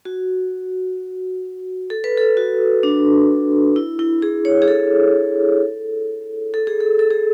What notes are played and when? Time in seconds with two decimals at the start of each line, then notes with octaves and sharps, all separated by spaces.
0.05 F#4
1.90 A4
2.04 B4
2.18 A4
2.37 F#4
2.83 D4
3.76 E4
3.99 E4
4.22 G#4
4.45 C#5
4.62 G#4
4.68 A4
6.54 A4
6.67 G#4
6.81 A4
6.99 A4
7.10 G#4